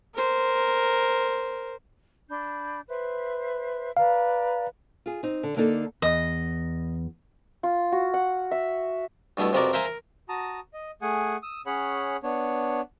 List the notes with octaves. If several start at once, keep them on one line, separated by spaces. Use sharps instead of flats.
A#4 C5
D4 B5 G6
B4 C5 E5
B4 D5 F5 A#5
F4 G#4
C4 D#4
D3
D3 A#3 D4 D#4 A4
E2 D#5
F4
F#4
F#5
E5
G2 B2 A3 B3 E4
F2 C3 B3 F#4 A#4 D5
A#4 C5 E5 F5 G#5 A#5
A#4
F#4 A5 A#5 D#6
D#5
A3 G#4 F#5 G#5
D#6 E6
C#4 G#4 C#5 F#5 B5
B3 D4 C#5